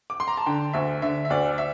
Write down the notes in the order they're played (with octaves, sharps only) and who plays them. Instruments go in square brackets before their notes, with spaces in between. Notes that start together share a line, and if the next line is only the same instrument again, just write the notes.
[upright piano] D6
C6
A#5
A5
D3 G5
D2 E5
D3 E5
E5
D2 D5
E5